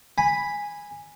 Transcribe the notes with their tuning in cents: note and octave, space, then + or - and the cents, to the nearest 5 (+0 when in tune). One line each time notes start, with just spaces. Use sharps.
G#5 -10 B5 +0